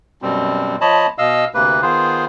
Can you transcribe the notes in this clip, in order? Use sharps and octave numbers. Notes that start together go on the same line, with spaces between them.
F#2 B2 G3 C4
F3 C#5 D#5 A5 B5
B2 D#5 F5 E6
D2 C3 A#3 B4
D#3 B3 F4 G#4 C5